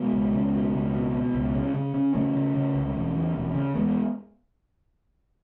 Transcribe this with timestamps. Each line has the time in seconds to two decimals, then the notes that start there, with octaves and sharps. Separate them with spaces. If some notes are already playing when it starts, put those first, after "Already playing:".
Already playing: B2 G#3 B3
0.13 C#2
0.33 C#2
0.54 B2
0.73 C#2
0.94 B2
1.14 B2
1.35 C#2
1.55 C#3
1.74 C#3
1.94 C#3
2.14 C#3 A3 C#4
2.34 C#3
2.55 C#3
2.75 C#2
2.95 E1
3.16 E2
3.36 E1
3.55 C#3
3.75 E2 G#3 B3